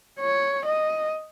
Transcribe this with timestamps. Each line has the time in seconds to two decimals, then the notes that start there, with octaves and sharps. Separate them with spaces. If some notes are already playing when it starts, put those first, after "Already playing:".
0.20 C#5
0.65 D#5